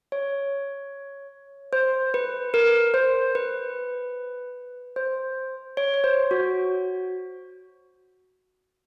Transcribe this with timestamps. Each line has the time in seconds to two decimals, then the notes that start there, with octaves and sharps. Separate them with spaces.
0.12 C#5
1.73 C5
2.14 B4
2.54 A#4
2.94 C5
3.35 B4
4.96 C5
5.77 C#5
5.94 C#5
6.04 C5
6.31 F#4